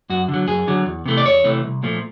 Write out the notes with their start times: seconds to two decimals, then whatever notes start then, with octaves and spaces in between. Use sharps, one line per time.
0.10 F#2 F#4
0.28 D3
0.34 F#3
0.47 F#2 G#4
0.67 D3 F#3
0.86 E2
1.06 C3 E3 A3
1.17 D5
1.25 E2 C#5
1.44 C3 E3 A3
1.64 C2
1.83 A#2 F3 A3